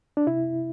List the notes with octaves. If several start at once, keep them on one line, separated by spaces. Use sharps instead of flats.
D4
C3 E4